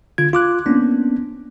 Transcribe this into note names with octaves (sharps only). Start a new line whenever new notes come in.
D3 F4 G#6
F4 D6 F#6
A#3 B3 C#4 D4